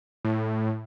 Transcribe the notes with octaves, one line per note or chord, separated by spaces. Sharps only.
A2